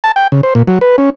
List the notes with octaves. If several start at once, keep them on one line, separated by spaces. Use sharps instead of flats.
A5
G5
C#3
C5
A#2
F#3
B4
C#4